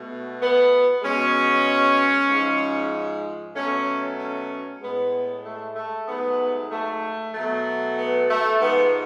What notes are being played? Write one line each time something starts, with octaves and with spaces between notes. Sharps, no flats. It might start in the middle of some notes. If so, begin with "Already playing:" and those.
Already playing: B2 A3
B3
B2 G#3 C#4
G#2 F3 G#3
B2 F#3 A3 C#4
C#4
A2 G#3 B3
A3
A3
G#2 F#3 A3 B3
A3
B2 F#3 A3
B3
A3
G#2 F3 G#3 B3